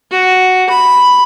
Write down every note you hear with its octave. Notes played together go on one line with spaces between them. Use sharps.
F#4
B5